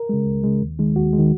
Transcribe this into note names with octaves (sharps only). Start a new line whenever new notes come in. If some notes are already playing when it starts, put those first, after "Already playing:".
Already playing: A#4
C#3 G#3
C#2
C#3 G#3
D#2
D#3 G#3
D#2 F#4
G#3
D#3